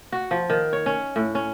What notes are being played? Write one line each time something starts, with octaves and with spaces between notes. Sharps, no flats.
F#4
F3
D#3
C#5
C#4
A2
C#4